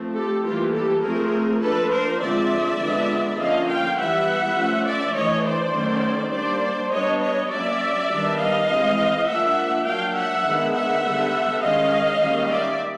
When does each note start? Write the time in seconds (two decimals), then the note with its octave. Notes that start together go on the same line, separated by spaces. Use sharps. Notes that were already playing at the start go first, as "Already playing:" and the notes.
Already playing: F3 A3 C4
0.15 G4 A4
0.44 E3 G3 A#3 F4 G4
0.73 G4 A4
1.03 F3 A3 C4 G#4 A#4
1.62 F3 A#3 D4 A4 B4
1.91 A#4 C5
2.20 D3 F3 G#3 C4 D5 E5
2.79 D3 F3 G#3 B3 D4
3.38 D3 F3 A#3 C#4 D#5 F5
3.67 F5 G5
3.97 E3 G3 B3 E5 F#5
4.56 F3 A3 C#4
4.85 D5 E5
5.14 E3 A3 D4 C#5 D#5
5.44 C5 D5
5.73 D#3 F#3 A3 C#4
6.32 G3 A#3 D4 C5 D5
6.91 G3 B3 D4 C#5 D#5
7.20 C#5 D#5
7.50 F#3 A#3 C#4 D5 E5
8.09 D#3 G3 B3 D4
8.38 D#5 F5
8.67 E3 G#3 C4
9.26 F3 A#3 D4 E5 F#5
9.84 F#3 A#3 D4 F5 G5
10.14 E5 F#5
10.44 D#3 G#3 B3 D4
10.73 E5 F#5
11.02 D3 G3 B3
11.61 D#3 G#3 C#4 D#5 F5
12.20 D#3 G3 A#3 C#4
12.49 D5 E5